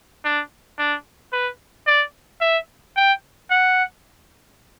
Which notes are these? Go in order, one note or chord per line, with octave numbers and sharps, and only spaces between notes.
D4
D4
B4
D5
E5
G5
F#5